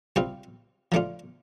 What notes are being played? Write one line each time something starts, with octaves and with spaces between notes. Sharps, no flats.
C3 G3 C4 F4
F3 A3 D4 F4